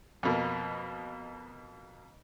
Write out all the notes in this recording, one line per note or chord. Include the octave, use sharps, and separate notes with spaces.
F2 B2 A#3